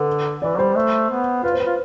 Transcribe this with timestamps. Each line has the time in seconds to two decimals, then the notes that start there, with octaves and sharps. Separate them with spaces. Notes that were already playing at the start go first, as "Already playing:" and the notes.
Already playing: D3 B4
0.41 E3 D5
0.58 G3 C5
0.75 A3
1.10 B3
1.43 F4 B4
1.52 C5
1.60 B4
1.66 F4